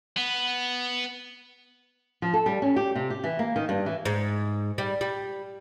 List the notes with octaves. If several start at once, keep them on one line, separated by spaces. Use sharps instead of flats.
B3
F3
A4
G3
C#4
G4
C3
G4
E3
A#3
D#3
G2
E3
G#2
G3
G3